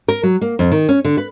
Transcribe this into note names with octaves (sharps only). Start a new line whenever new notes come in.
A#4
F#3
A#3
F2
D#3
C#4
D3
B4